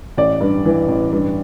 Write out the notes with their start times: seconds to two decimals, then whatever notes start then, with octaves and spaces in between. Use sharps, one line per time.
0.17 A1 D5
0.40 G2
0.65 E3
0.88 A1
1.12 G2